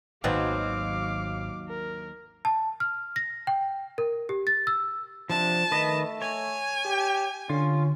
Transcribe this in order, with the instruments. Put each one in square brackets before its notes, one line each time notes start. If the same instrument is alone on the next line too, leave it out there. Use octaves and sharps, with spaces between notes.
[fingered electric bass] G#1 [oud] D#2 F#3 [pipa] B2 B3 C4 [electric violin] F5 D6
[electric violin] A#4
[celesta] A5
F6
A#6
G5
A#4
G4
A6
E6
[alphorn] C3 [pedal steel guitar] F3 D4 [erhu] A5
[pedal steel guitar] D#3 B4 D#5 [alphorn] A3
[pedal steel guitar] C#5 [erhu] G#5
[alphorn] G4
[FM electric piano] D3 [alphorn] C#4 [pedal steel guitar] F4